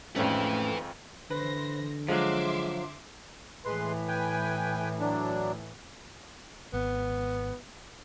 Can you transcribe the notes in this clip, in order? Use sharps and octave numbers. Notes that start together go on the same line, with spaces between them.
G#1 F2 A2 E3 A3 C#4 B4
D3 E3 B4 C5 A#6
F3 F#3 G#3 E5 C6 D6
A2 E3 G#3 B4 C6
B4 G5 G#5
F#3 D4
G#1 B3